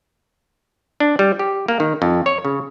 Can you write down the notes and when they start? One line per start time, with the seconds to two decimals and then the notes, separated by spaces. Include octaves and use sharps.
1.00 D4
1.19 G3
1.39 G4
1.68 A#3
1.80 D#3
2.02 F2
2.26 C#5
2.45 C#3